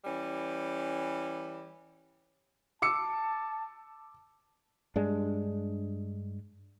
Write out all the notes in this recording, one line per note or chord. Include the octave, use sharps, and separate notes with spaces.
E3 G3 C#4
A5 D6 E6 C#7
G2 G#3 D4